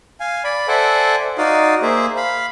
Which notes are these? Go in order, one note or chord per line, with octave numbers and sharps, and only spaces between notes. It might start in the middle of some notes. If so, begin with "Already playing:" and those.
F5 G#5
D5 B5
A4 C5 D5 E5 F#5 G#5
D#4 F#4 D5 F5 D#6
A#3 G#4 C5 E5
F5 B5